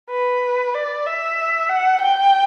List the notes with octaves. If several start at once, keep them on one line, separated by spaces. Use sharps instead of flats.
B4
D5
E5
F#5
G5